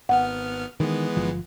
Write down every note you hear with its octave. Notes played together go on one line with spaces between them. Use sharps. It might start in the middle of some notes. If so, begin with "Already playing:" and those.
G#1 B3 F#5 F6
D#3 E3 G#3 B3
G1 F3